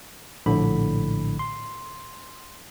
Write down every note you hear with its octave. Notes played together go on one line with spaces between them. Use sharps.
A#1 A2 D3 B5
C6